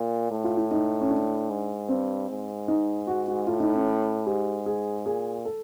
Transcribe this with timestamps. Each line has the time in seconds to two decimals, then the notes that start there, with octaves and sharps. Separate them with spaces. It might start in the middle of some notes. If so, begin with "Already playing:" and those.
Already playing: A#2
0.31 A2
0.44 F4
0.57 E4
0.71 D#4
1.01 C#4
1.11 D4
1.50 G#2
1.89 G2 C4
2.29 G#2
2.68 D#4
3.07 F#4
3.28 F#4
3.47 A2 F4
3.60 D#4
3.74 C#4
4.26 G#2 G4
4.66 G#4
5.05 A#2 G#4
5.45 A4